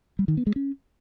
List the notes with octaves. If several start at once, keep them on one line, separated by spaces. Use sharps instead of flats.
G3
D#3
B3
G#3
C#4